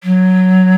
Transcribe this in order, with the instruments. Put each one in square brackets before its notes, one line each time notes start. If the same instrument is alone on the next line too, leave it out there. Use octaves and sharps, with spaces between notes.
[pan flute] F#3